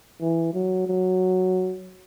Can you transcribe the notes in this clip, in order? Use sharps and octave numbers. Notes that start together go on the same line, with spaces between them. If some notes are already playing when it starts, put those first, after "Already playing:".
E3
F#3
F#3